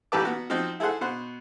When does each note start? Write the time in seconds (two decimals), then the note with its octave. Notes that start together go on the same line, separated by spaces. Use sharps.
0.12 A1 E3 G4 B4 A5 D6
0.25 B3 F#4
0.50 F3 C4 D#4 F#4
0.80 E4 G#4 A4 C5 F#5
1.01 B2 C5 F#5